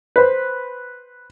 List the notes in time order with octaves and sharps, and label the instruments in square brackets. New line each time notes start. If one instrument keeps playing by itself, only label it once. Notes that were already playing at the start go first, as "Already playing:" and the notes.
[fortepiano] B4 C5